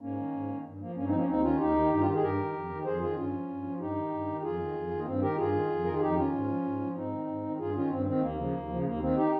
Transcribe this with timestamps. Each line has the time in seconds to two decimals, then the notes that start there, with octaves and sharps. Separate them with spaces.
0.01 G#2 A#3 C#4
0.17 D#3
0.33 G#2
0.48 D#3
0.64 G2
0.80 F3 A#3
0.95 G2 A#3 C#4
1.06 C4 D#4
1.11 F3
1.17 A#3 C#4
1.27 D#2 C4 D#4
1.42 D#3 C#4 F4
1.58 D#2 D#4 G4
1.75 D#3
1.90 G2 D#4
2.00 F4
2.06 D#3 G4
2.15 G#4
2.22 G2 G4 A#4
2.37 D#3
2.53 F2
2.69 D#3
2.85 F2 G#4 C5
3.00 D#3 F4 G#4
3.16 G2 C#4 F4
3.32 F3
3.48 G2
3.64 F3
3.80 G2 D#4 G4
3.96 D#3
4.12 G2
4.27 D#3
4.43 F2 F4 G#4
4.59 D#3
4.74 F2
4.90 D#3
4.99 A#3
5.06 G2 C4
5.22 D#3 G4 A#4
5.37 G2 F4 G#4
5.53 D#3
5.70 F2
5.85 D#3 A#4
5.93 G#4
6.01 F2 D#4 G4
6.16 D#3 C#4 F4
6.32 G#2
6.48 F3
6.64 G#2
6.80 F3
6.95 G#2 C4 D#4
7.12 D#3
7.27 G#2
7.43 D#3
7.59 G2 F4 G#4
7.74 D#3 C#4 F4
7.90 G2 C4
8.06 D#3 C4
8.22 D#2 A#3
8.38 C#3 F3
8.53 D#2
8.69 C#3 F3
8.85 D#2 A#3
9.01 D#3 C4
9.17 D#4 G4